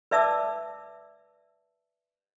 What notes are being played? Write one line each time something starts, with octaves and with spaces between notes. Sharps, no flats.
B4 D5 E5 A5 D6 E6